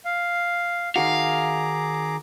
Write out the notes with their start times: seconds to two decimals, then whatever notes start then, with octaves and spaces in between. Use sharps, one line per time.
0.05 F5
0.96 D#3 F#4 G#4 F5 A#5 D6